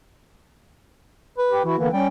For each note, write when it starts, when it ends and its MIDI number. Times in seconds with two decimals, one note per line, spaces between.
1.38 1.62 71
1.51 1.63 67
1.65 1.74 52
1.65 1.76 64
1.65 1.76 66
1.78 1.88 50
1.78 1.88 52
1.78 1.88 58
1.78 1.88 59
1.93 2.08 55
1.93 2.07 61
1.93 2.07 79